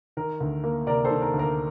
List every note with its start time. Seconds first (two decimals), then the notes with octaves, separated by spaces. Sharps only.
0.17 D#3 A#4
0.40 D2
0.64 A#3
0.87 C3 A#4 D5
1.05 A4 C5
1.10 D#3
1.22 A#4
1.34 D2
1.39 A#4